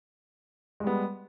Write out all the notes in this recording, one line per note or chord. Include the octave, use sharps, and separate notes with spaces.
G3 G#3 B3